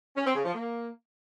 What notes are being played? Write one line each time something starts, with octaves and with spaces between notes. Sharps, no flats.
C#4
C4
C#3
F3
A#3